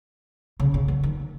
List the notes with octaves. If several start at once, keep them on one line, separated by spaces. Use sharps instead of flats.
C#3
C#3
D3
D#3